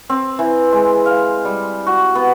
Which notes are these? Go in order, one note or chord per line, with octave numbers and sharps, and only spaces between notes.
C4
E3
G#3
F5
G3
F#4
B3